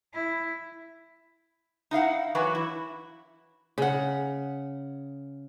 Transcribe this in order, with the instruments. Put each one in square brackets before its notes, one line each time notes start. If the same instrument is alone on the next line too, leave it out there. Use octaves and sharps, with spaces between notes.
[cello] E4
[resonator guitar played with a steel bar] D#4 E4 F5 F#5
E3 F#3 F#4 B4
E4
[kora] C#3 F#5